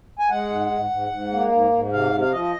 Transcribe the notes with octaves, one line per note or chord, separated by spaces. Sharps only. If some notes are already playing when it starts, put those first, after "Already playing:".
G#5
G#3 F#5
G#2
G#2
G#2
G#2
A#3
G#2
G#2
C3 F5
C3
F5
F3 D#5